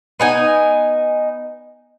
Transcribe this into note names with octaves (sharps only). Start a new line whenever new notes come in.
B3 D#4 G#5